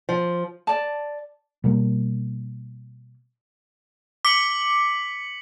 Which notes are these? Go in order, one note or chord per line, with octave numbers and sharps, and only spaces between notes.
F3
D5 A5
B2 G3 A#3
D6 B6 C#7 F#7